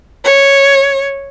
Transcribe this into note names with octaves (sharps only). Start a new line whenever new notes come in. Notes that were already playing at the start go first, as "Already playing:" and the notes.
C#5